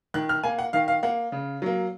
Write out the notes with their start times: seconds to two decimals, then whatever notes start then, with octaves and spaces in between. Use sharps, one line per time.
0.14 D#3 F#6
0.29 F6
0.43 A#3 G#5
0.59 F#5
0.73 D#3 F5
0.88 F5
1.03 A#3 F#5
1.32 C#3
1.62 F#3 A#3